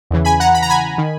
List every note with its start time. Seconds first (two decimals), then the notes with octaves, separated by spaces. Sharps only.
0.11 E2 C#3 E3
0.25 G#5 B5
0.40 F#5 A#5
0.54 B5
0.62 A#5
0.70 G#5 B5
0.98 D#3